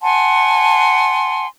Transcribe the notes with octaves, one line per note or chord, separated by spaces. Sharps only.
F#5 G#5 A5 C6